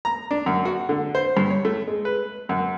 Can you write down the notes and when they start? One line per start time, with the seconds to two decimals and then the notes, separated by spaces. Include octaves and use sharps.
0.05 A#5
0.31 D4
0.46 F#2
0.65 F#4
0.89 D3
1.15 C5
1.37 G2
1.50 C#5
1.65 A3
1.88 G#3
2.05 B4
2.49 F#2